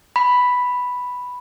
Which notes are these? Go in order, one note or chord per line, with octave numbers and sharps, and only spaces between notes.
B5